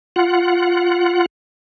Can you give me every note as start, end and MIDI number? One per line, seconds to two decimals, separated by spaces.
0.16 1.26 65
0.16 1.26 78